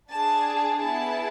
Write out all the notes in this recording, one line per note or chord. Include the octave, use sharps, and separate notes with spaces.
D4 G#4 A5
B3 E4 G#4 A5